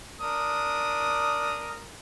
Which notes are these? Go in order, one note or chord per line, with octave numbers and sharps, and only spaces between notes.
D4 A#4 D#6